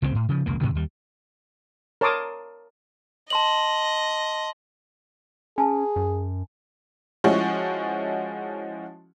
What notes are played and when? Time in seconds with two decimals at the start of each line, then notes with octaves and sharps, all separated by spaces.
0.02 C#2 C#3 E3 C4
0.15 A2
0.29 C#3 F3
0.46 E1 C#2 A#3
0.61 G#2 C3 D#3
0.75 D#2 G3
2.01 A#4 C#5 A5 C6 D6 D#6
3.30 D#5 A5 C6 F#7
5.58 C#4 G#4 G#5 A5
5.96 F#2
7.24 F3 G#3 C#4 E4 F#4 C#6